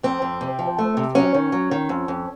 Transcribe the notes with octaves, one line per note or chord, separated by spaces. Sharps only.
F2 C4
F2
C3
F3
A3
C3
F#3 C#4
D#3
F#3
D#3
F2
F2